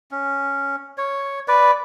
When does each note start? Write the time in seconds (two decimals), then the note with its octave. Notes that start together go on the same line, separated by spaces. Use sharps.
0.11 C#4
0.98 C#5
1.48 B4 D5